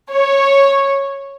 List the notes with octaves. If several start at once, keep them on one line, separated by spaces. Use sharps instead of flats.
C#5